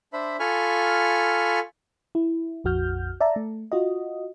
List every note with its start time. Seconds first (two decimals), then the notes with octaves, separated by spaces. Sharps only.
0.13 D4 C5 E5 B5
0.40 F4 A4 G#5 B5 C#6 F6
2.15 E4
2.64 A#1 F2 F#4 F6 G6
3.21 D5 E5 A5 A#5
3.36 A3
3.72 F4 F#4 D#5